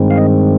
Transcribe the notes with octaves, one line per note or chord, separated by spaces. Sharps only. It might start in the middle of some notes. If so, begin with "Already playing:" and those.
Already playing: G2 D#3 G#3 C4
F5
D#5